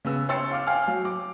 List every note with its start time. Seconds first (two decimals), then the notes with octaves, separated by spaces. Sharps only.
0.05 C#3 B3 E6
0.29 C#5 G5 C6 E6 A6 C#7
0.51 F5 D6 F6
0.67 F5 G5 G#5 F6
0.88 F#3
1.05 D6